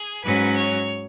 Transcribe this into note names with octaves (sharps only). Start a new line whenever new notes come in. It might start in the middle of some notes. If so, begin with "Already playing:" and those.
Already playing: G#4
G#2 F#3 C#4 B4
C#5